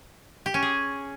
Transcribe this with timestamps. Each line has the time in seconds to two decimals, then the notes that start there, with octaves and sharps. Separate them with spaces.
0.46 G4
0.54 C#4
0.62 G#4